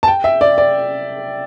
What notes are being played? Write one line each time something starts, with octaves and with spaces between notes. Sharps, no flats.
A5
G5
E5
D5
D5